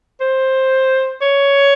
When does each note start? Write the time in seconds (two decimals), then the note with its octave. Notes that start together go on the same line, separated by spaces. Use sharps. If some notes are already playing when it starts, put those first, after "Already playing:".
0.21 C5
1.21 C#5